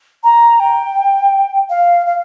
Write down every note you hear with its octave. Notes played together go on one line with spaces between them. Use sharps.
A#5
G5
F5
F5